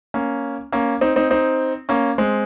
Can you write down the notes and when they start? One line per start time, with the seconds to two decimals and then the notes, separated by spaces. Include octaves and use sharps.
0.14 A#3 C#4
0.72 A#3 C#4
1.01 C4 D#4
1.16 C4 D#4
1.31 C4 D#4
1.89 A#3 C#4
2.18 G#3 C4